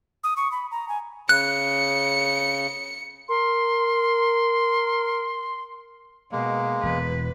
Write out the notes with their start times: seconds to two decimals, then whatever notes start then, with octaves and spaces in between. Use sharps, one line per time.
0.24 D#6
0.37 C#6
0.52 B5
0.71 A#5
0.89 G#5
1.29 C#3 F#6 C#7
3.29 A#4 C6
6.32 B2 G#3 A#3
6.83 E1 E2 B4